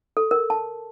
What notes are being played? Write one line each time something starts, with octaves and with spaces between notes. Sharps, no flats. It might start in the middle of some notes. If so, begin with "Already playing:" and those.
A4
A#4
A5